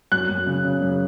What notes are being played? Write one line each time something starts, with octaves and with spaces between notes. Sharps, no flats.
F#2 F#6
F#2
C#3
C#3
F#2